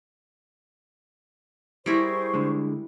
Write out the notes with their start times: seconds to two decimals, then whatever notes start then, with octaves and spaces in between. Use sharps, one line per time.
1.86 G3 E4 G#4 A#4 C5 C#6
2.34 D3 G#3